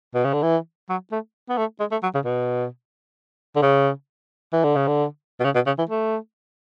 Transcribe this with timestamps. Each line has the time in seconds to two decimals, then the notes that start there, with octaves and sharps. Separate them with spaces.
0.14 B2
0.24 C#3
0.33 D3
0.43 E3
0.89 F#3
1.12 A3
1.49 B3
1.58 A3
1.80 G#3
1.91 A3
2.03 F#3
2.14 C#3
2.25 B2
3.56 D3
3.62 C#3
4.53 E3
4.64 D3
4.76 C#3
4.88 D3
5.40 B2
5.44 C#3
5.55 B2
5.66 C#3
5.78 E3
5.89 A3